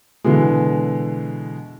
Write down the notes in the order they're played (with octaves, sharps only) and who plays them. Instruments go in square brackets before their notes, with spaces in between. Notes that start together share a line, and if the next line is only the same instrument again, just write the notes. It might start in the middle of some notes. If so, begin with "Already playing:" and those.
[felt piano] B2 D3 E3 G#3